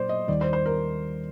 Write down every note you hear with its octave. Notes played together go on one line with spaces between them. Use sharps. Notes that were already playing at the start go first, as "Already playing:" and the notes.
Already playing: A#2 F#3 A#3 C5 D5
D#5
D#2 D#3 G3 D5
C5
C5
A#4